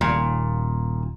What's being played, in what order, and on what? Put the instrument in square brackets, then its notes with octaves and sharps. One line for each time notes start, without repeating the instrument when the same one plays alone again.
[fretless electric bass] D#1 [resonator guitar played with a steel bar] A#2